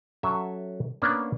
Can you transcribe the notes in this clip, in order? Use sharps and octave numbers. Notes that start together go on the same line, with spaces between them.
F#3 C#4 A4 E5
A#3 B3 C#4 D4